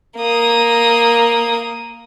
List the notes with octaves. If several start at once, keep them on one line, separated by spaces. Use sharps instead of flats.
A#3 D#6